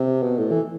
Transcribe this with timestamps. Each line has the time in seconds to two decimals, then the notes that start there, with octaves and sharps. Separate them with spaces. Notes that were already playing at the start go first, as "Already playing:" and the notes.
Already playing: C3
0.23 B2
0.37 A2
0.51 E3